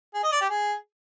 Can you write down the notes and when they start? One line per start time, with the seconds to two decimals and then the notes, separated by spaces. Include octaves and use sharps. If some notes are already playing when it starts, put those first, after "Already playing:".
0.14 G#4
0.23 D#5
0.32 D5
0.41 G4
0.50 G#4